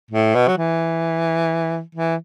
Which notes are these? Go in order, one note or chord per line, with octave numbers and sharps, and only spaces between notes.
A2
B2
F#3
E3
E3